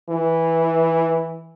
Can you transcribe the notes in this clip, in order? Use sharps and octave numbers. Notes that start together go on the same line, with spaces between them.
E3